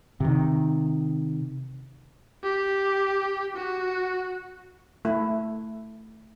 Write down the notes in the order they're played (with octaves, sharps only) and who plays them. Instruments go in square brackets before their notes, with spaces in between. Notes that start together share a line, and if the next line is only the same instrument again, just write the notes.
[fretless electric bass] C3 D#3
[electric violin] G4
F#4
[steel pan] A3 E4